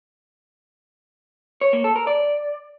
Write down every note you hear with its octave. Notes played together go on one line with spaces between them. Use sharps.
C#5
A#3
A4
A#4
D5